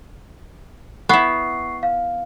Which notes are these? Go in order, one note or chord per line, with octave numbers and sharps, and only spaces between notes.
B3 E4 C#6 C7
F5